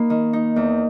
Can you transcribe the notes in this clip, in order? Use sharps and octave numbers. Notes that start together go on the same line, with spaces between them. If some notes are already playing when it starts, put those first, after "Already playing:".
Already playing: A#3 D#4 B5
D#3
D#4
E2